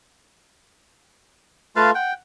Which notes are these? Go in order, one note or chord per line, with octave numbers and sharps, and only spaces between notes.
A3 F4 B4 F5 A5
F#5 G5